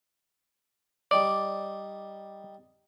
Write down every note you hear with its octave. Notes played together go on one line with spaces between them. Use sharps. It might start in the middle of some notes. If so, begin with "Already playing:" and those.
G3 D#4 D5